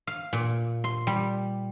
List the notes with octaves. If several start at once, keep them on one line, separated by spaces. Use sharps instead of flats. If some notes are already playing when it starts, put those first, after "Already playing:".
F5
A#2
C6
G3